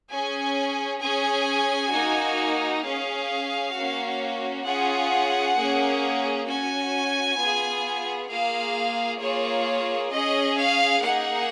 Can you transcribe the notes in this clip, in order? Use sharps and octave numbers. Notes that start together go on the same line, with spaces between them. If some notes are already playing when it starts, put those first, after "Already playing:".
C#4 G#4 G#5
C#4 G#4 G#5
A#3 D#4 F#4
C#4 G#4 F5
A#3 C#4 F#4
C#4 F4 G#4 F#5
A#3 C#4 G#4
C#4 F#4 G#5
B3 F4 G#4
A#3 F4 G#4 F5
A#3 F4 G#4 C#5
C#4 G#4 D#5
F5
A#3 D#4 G#4 F#5